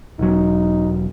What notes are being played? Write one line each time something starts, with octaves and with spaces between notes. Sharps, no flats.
E1 F#3 D#4